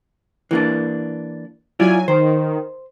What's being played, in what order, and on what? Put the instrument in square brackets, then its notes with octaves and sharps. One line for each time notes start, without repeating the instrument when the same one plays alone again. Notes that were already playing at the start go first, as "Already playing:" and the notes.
[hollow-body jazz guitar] E3 A#3 D4
[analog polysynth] F#3 G#5 [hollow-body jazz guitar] E4 F4 D5
[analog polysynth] D#3 [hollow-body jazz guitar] C5